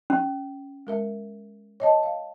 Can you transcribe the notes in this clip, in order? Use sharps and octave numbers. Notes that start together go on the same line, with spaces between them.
C#4
G#3 A#4 E5
C#5 D#5 A5
F5